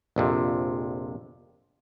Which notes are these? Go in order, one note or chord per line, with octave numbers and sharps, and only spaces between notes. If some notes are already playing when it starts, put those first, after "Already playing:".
A#1 F2 C3